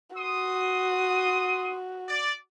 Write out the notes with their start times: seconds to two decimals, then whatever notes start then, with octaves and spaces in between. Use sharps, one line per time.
0.16 F#4 C6 D#6
2.08 D5